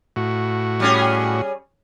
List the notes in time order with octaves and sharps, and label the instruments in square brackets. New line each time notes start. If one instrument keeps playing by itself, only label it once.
[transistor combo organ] A2 F#4
[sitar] G3 C#4 G#4